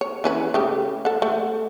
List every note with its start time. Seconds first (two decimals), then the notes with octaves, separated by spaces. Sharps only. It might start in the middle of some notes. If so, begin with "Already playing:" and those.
0.01 C#5
0.24 E3 C#4 B4
0.54 C#3 A3 G4
1.05 A4 F#5
1.22 A3